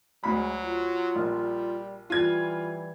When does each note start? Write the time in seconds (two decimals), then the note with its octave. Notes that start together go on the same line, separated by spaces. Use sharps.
0.24 D2 F#3 G#3 B5
0.62 F4
1.16 A#1 G3
2.10 E3 G3 F4 G#6